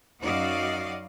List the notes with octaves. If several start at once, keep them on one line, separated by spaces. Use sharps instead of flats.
F#2 D#4 F#4 D5 D#5 F5